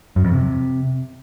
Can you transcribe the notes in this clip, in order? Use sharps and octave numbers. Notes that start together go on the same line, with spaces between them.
F#2
F2
C3